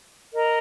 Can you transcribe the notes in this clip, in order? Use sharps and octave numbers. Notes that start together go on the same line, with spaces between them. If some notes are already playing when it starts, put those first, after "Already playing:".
A#4 D#5 A#5